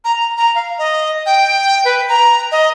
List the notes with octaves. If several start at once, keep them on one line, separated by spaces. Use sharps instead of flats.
A#5
A#5
F5
D#5
G5
B4
A#5
D#5